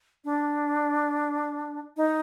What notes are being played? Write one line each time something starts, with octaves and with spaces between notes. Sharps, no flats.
D4
D#4